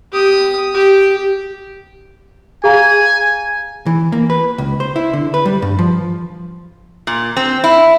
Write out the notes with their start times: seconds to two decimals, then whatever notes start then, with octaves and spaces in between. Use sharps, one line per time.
0.12 G4 D#6
0.74 G4
2.64 G#4 F5 G#5 A#5
3.86 E3
4.12 A#3
4.30 B4
4.58 C#2
4.80 C5
4.96 E4
5.13 D3
5.34 B4
5.45 G3
5.62 G2
5.79 F3
7.07 A#2
7.37 C4
7.64 E4